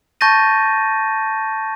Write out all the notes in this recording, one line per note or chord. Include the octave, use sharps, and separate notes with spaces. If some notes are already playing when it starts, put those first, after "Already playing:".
A5 C#6 G6 A6 A#6 D#7